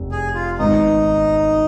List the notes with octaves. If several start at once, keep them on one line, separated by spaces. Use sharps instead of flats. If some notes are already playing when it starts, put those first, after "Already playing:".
Already playing: F1
G#4
F4
G#1 G#2 D#3 B3 D#4